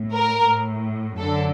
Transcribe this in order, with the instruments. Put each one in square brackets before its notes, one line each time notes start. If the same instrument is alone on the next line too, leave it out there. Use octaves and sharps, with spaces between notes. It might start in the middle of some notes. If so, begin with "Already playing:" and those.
Already playing: [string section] A2
A#4
A2
F#2 D3 A4